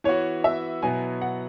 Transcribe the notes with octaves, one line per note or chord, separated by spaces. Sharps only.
E3 B3 F#4 C#5
E5
B2 F#3 B3 E4 G#5
F#5